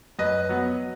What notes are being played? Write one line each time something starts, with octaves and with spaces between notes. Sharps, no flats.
F#2 B4 D#5
F#3 B3